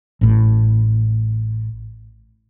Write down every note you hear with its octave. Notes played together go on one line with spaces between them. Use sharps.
A1 A2